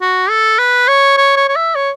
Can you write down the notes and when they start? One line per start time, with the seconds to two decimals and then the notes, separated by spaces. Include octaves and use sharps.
0.01 F#4
0.30 A4
0.59 B4
0.88 C#5
1.17 C#5
1.37 C#5
1.48 C#5
1.56 E5
1.75 C#5